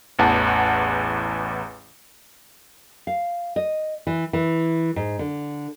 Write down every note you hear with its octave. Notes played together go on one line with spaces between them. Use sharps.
A1 E2 F#5 A5
F5
D#5
E3
E3
G#2
D3